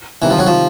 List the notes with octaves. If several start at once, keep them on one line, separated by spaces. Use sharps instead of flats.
C3 D#3 E3 G3 C4
F3
F#3
F3